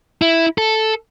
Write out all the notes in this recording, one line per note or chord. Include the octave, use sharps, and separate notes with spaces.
E4
A4